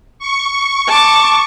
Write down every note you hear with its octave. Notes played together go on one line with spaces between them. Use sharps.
C#6
A5 D6